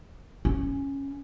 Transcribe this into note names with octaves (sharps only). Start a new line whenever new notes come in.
C#4